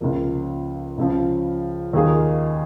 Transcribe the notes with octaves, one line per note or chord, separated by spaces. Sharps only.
C#2 C#3 F3 A#3
C#2 C#3 F3
D#2 D#3 A#3 F4 G#4